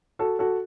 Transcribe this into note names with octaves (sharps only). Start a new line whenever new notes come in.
F#4 A4
F#4 A4